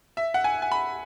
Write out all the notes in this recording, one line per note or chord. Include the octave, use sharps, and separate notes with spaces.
E5
F#5
G#5
G#5
B5